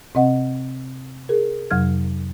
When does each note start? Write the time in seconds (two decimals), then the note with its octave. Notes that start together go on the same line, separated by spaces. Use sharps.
0.15 C3 C4 D#5 F#5
1.29 G#4 A#4
1.71 F2 C3 F#3 F6 G#6